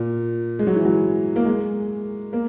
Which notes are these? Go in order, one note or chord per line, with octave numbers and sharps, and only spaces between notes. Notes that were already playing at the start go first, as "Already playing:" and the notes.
Already playing: A#2
G#3
F#3
E3
F#3
A#3
G#3
A#3